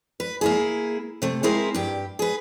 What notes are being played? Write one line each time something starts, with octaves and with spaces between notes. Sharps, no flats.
B4
A#3 E4 G#4
C3 A3
G#3 C4 E4 G#4 A#4
G2 G4
G#4 B4